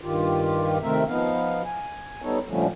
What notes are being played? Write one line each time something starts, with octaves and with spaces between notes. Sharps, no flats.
G2 D#3 F4 G4
C3 D#3 A3 C4 A#4 E5
F3 B3 D#4 F5
G#5
G3 B3 D#4 A4 C#5
A#2 D3 F3 G3 A3 C#4